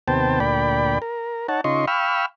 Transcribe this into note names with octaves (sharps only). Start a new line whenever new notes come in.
D#2 C3 B3 C5 G5 A5
D2 A#2 D5 G5 B5
A#4
D#4 C#5 F#5 A5
C#3 D#4 F4 D#5 C6 C#6
F5 G5 B5 C#6 E6 F6